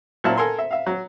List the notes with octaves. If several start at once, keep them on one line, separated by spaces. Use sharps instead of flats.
A#2 F#3 E4 A5 F6
A4 A#4 G#5 C6
E5
E5 F5
F#3